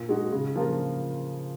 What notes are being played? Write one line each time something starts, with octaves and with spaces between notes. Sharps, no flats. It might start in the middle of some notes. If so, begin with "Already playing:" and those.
Already playing: A#2
G#3 D#4 F#4
C#3
F3 A#3 F4 A#4